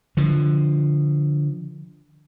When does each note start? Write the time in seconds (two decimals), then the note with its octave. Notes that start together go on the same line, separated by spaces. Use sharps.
0.17 D3 F3